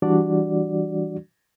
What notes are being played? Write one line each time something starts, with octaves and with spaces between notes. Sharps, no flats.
E3 G3 D4 F#4 D5